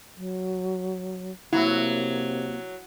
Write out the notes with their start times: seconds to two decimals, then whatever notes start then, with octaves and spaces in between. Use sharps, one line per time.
0.16 F#3
1.53 C3 F#3 A#3 E4